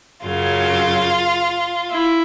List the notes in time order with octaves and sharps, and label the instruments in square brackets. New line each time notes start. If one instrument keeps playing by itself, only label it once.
[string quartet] F#2 C#3 F#3 F4
E4